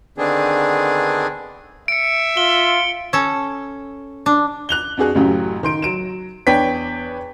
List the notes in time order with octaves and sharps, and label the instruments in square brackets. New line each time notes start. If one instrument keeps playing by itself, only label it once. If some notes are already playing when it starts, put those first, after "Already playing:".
[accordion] D3 D#3 B3 C4 D4 G#4
[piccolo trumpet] E5 [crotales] C#7 D7
[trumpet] F4 [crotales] G7
[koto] C#4 A4
D4
[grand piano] F#6 F7 G7
F2 D4 F#4 G#4 F#6
A1 F#2 A2 C#3 F#3 G4
D#3 C6 D7
F#3 D7 E7
E2 D4 B4 C#5 G5 B6